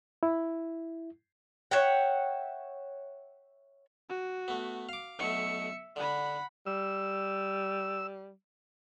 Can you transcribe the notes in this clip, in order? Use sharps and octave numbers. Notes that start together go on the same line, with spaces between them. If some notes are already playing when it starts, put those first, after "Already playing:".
E4
C#5 E5 F#5 G5
F#4
A3 B3
F5 D6
B1 B2 A3 E5 C#7
D3 F#5 B5
G3 E6